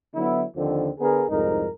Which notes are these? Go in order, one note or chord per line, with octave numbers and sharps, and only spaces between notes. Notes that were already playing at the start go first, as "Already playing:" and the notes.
D3 F#3 B3 E4
D#2 D3 D#3 F3 C4
D3 B3 G#4 A#4
C2 F2 G#2 D#4 A#4